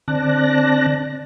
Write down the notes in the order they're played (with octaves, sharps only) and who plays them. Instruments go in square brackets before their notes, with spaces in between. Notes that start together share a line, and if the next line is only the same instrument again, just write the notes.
[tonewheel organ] D3 C4 D5 A5 F#6 A#6